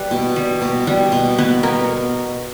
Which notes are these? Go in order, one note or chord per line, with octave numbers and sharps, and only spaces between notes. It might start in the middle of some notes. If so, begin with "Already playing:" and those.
Already playing: G3 B4
B2
G3
B2
G3
B2
B3 B4
B3 A#4